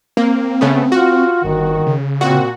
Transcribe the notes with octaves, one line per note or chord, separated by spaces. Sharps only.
A#3 C4
C#3 A3 B3
F4 F#4
G1 D#3
C#3
A#2 C4 F#4